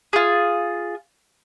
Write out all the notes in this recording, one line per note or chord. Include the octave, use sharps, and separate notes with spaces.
F4 G#4